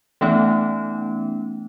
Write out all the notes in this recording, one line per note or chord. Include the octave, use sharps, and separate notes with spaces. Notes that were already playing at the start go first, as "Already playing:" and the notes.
E3 A3 B3 C#4 D#4